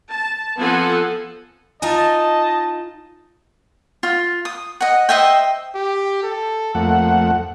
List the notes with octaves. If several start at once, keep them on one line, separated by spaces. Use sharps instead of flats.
A5
F3 B3 C4 A4 F#5 G#5
D#4 F4 D#5 G#5 A5
F4
D#6
D#5 F#5
C5 D#5 E5 G5
G4
A4
F2 A3 A#3 F#5